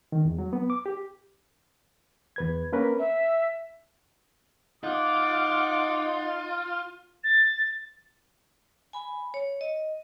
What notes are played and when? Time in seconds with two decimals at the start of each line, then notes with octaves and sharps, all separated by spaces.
0.12 D#3
0.25 E2
0.38 F#3
0.53 B3
0.70 D6
0.86 G4
2.36 E2 B4 G#6
2.72 A#3 C#4 A#4 B4
2.99 E5
4.83 D#4 F4 F#5 D6
7.23 A6
8.93 G#5 B5
9.34 C#5
9.61 D#5